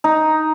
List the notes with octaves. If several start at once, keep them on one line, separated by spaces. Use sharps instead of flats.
D#4